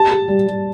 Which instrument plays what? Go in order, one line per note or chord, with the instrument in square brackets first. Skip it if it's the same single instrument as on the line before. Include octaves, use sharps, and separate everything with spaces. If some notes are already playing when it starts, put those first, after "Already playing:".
Already playing: [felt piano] G4 [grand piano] A5
[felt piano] G4
G3
G3